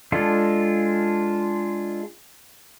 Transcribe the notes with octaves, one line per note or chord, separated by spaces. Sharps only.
G#3 D4 F4 A4